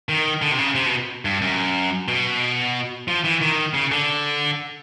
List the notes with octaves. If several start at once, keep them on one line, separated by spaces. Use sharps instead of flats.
D#3
D3
C3
C#3
C3
B2
G2
F#2
B2
F3
E3
D#3
C#3
D3